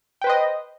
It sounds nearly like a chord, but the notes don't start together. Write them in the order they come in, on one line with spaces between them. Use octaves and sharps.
G5 B4 C5 D#5